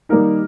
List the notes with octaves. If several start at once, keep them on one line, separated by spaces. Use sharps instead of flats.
D#3 G3 A#3 D#4 A#4